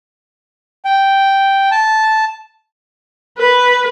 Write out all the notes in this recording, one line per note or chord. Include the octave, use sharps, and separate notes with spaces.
G5
A5
B4